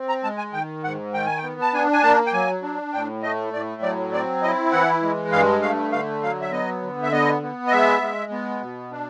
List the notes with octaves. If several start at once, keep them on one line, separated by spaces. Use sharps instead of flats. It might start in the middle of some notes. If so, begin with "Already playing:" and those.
Already playing: C4
A#5
G#3 A5
G#5
D#3 G5
G#2 F#5
D#3 G5
G#5
G5
B3
A5
D4 G#5
G#5
A#3 A5
G5
F#3 G#5
D4
A2 G5
A3 D#5
A2 D5
F#3 D5
C4 D5
E4 D#5
E3 F#5
G#3
G2 F5
A3 F5
D3 F5
F#3 F5
E5
B3 D#5
D3
E5
B3 D#5
B3
D#5
G#3 E5
G#3
B3
B2
D4